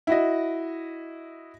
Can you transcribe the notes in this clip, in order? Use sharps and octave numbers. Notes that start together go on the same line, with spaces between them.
E4 F#4 D#5